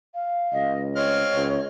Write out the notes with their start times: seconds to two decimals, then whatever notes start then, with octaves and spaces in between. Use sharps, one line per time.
0.15 F5
0.53 C#2 D#5
0.96 C4 F4 C#5 D#5 F6
1.35 C#2